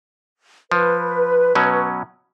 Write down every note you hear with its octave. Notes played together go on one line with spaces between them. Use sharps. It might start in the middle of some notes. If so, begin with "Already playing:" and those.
F3 B4
B2 F#3 C#4